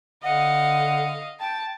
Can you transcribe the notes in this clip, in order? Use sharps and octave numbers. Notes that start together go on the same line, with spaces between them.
D3 D#5 F5 F#5
G5 A5